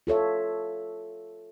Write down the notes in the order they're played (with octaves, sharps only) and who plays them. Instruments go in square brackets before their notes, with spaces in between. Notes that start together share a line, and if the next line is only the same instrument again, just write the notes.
[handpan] F4 A4 C#5 E5